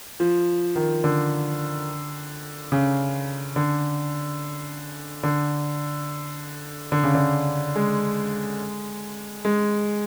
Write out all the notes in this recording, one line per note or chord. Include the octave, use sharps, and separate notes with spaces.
F3
D#3
D3
C#3
D3
D3
D3
C#3
D3
G#3
G#3